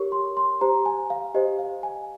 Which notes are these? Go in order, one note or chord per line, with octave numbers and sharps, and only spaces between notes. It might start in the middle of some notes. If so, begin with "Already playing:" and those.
Already playing: G4 A#4 C#5 C#6
C6
C6
G4 C5 A#5
G#5
F5
G4 C5 D#5
F5
G#5